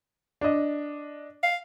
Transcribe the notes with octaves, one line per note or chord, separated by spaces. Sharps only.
D4 D#5
F5